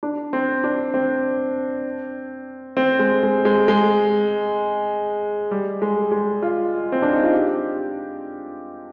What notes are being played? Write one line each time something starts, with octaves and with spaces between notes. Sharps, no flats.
D4
C4
D4
C4
C4
G#3
G#3
G#3
G#3
G3
G#3
G#3
F4
C4
D4
D#4
F4
G4